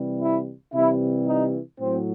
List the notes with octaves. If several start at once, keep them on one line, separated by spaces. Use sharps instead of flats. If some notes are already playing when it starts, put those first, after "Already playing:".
Already playing: C3 E3 G3
E4
C3 E3 G3 E4
D#4
A2 F#3 C4